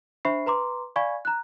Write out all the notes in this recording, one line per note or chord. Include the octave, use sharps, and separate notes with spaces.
D4 C5 E5 B5 C#6 C7
B4 A#5 C6 D6
D5 F5 G#5 B5 C#6 G#6
A#5 F#6